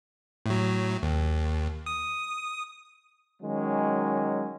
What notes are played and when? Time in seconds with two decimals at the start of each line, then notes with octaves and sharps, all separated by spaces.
0.46 A2 F#3
1.03 D#2
1.86 D#6
3.41 D#3 F#3 G#3 C#4